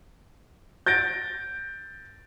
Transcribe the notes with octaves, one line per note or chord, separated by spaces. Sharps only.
G6 A6 A#6 D7